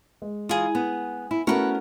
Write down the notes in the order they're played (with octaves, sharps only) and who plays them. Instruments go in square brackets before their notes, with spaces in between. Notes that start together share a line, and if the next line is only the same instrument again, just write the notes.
[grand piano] G#3
[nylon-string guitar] E3 F4 [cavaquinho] G#4 D#6
[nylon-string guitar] B3
E4
[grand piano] A3 C#4 F#4 [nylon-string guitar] B3 A#4 [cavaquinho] B4 C#6